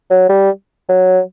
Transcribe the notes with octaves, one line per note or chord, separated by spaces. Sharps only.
F#3
G3
F#3